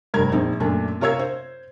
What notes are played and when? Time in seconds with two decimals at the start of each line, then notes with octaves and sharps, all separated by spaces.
0.14 F1 G2 A#4 G#6
0.32 A#1 C4 D#4
0.60 F#2 A#2 A3 D4
1.00 C3 F4 A#4 C#5 E6 G#6
1.19 C5